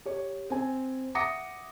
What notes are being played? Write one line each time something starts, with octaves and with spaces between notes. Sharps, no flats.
G4 C#5
C4 G#5
E5 F#5 D6 D#6 A#6 C#7